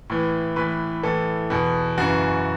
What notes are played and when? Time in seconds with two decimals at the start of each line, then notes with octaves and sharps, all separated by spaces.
0.10 A2 E3
0.56 A2 E3 B4
1.03 A2 E3 A4
1.50 E2 B2
1.98 F#2 C#3 E3 F#4